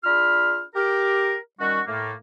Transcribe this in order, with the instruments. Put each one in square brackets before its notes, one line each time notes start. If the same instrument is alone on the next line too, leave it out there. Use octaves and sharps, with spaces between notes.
[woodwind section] D4 F4 G#4 B5 F6
G4 A#4
D#3 G3 C#4 F#4
A2 A3 A#3